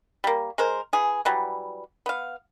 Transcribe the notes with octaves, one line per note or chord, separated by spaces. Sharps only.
G3 A#3
G#3 A#4 C5
E3 G#4
E3 F#3 G3
B3 F5